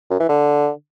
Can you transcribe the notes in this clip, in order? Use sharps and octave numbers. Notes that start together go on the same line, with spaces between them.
F#2
E3
D3